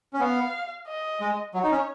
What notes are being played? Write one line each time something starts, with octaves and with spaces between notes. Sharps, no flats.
C#4
B3 F5
D#5
G#3
F#3 C#5
D#4
C#4